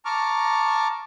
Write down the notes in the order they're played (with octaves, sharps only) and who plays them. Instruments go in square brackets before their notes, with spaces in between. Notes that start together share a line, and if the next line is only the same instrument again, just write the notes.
[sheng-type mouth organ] A5 A#5 C#6 D6 F6